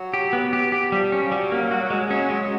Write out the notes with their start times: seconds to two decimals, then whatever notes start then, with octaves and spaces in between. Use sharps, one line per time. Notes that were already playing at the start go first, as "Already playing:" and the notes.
Already playing: F#3
0.14 G4
0.33 B3
0.53 G4
0.72 G4
0.92 F3 G3
1.12 C#4
1.32 F#3 G3
1.52 A#3
1.71 F#4
1.90 G#3
2.10 F#3 C#4
2.30 G#3